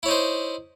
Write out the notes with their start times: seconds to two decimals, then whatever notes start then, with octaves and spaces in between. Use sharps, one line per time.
0.03 E4
0.06 C#5
0.08 D#4
0.11 C5